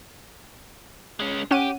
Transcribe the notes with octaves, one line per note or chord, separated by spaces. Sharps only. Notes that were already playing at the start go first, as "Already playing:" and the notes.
G#3 C#4
C#4 G4 F#5 D#7